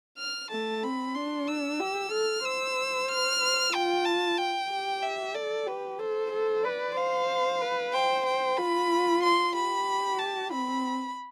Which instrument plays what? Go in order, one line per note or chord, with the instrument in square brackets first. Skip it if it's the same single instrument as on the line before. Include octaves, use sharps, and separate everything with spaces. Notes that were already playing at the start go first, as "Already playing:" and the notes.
[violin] F6
[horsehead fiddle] A3 [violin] A5
[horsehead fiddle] C4 [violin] B5
[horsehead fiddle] D4 [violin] C6
[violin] E6
[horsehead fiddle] G4
[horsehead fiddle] A4 [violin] F6
[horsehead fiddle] C5 [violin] E6
[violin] F6
[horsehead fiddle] C5
[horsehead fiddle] F4 [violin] G5
[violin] A5
G5
[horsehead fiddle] G4
[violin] E5
[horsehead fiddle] A4 [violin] D5
[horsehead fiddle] G4 [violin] B4
[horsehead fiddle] A4 [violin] C5
[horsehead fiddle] A4
[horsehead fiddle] B4 [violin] D5
[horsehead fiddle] C5 [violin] F5
[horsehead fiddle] B4
[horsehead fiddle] C5 [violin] G5
[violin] G5
[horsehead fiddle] F4 [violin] B5
[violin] C6
[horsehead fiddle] G4 [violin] B5
[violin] A5
[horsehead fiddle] C4 [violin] B5